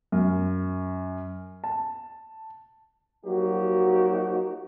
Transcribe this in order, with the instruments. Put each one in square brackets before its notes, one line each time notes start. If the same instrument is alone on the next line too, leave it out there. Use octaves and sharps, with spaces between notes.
[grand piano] F#2
A5
[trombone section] F3 F#3 A#3 D#4 F#4 G4